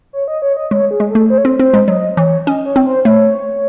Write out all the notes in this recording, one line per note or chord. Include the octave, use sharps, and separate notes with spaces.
C#5
D#5
C#5
D#5
G#3 C#5
G#4
G#3
A3 A4
C5
C#5
C4 C5
C4 C5
G#3
F#3 D#5
E3 C#5
C#4 D#5
C#5
C4
C5
A3 C#5